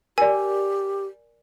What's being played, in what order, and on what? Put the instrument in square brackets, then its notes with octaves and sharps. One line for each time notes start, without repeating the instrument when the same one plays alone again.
[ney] G4 [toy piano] A#4 D5 [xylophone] G#5